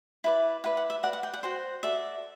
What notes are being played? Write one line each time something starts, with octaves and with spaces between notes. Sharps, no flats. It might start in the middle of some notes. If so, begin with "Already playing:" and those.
E4 B4 D5
E4 B4 D5 F#5
F#5
E5
F#4 B4 D5 F#5
F#5
G5
F#5
F#4 C5 G5
F#4 A4 D5 E5